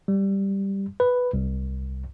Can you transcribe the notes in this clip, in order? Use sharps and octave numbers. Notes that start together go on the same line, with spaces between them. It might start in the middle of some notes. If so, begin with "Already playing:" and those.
G3
B4
C2